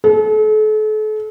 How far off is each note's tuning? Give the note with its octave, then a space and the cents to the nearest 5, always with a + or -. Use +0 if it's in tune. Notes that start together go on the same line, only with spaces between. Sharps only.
A4 -40